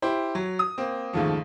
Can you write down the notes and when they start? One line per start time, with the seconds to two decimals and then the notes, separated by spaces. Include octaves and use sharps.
0.02 E4 G4 C5
0.35 F#3
0.59 D#6
0.78 A#3 C4
1.13 D#2 G#2 C#3 F3 A3